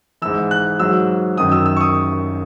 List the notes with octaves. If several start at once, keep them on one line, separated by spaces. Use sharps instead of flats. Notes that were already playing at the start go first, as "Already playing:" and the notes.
G#2 E3 E6
F#6
G#2 F#3 E6
F#2 D#3 F#3 D#6
E6
E6
C#6
D#6